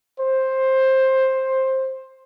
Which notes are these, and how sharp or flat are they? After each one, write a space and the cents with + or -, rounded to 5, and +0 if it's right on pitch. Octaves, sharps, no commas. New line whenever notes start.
C5 +10